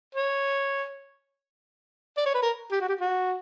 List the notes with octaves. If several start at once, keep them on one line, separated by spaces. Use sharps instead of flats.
C#5
D5
C#5
B4
A#4
G4
F#4
G4
F#4